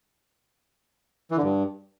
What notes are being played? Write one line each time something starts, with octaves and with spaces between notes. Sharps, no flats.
E3
D3
G2